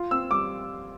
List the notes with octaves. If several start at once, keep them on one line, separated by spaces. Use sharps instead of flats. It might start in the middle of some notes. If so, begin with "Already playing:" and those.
Already playing: F4
C4 E6
G3 D6